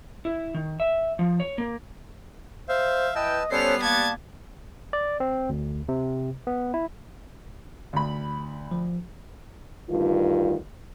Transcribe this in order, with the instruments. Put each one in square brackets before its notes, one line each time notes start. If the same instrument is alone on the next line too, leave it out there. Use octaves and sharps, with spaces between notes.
[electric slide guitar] E4
D#3
E5
F3
C#5
A#3
[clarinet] C5 [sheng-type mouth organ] E5 F5
[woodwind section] E3 G5 [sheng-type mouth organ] B4 A5 E6 [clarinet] D#5
[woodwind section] G3 B3 [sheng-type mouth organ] C#4 A4 C5 [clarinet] C#5 [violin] C7 F7
[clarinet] A#3 [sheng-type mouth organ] A5 [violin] G#6 A6
[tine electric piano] D5
C4
D2
C3
B3
E4
[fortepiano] D2 B5
[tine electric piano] F3
[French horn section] D2 G2 D#3 F4